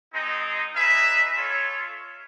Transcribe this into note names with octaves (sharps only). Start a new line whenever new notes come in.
G#3 C4 D#4
D#4 G#4 B4 E5
F4 A4 C#5